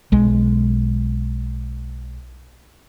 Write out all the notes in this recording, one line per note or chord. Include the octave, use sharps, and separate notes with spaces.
B1 G#3